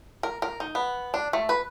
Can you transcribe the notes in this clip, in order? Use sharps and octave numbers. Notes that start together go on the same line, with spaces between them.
A#4
A#4
D#4
B3
D4
A3
B4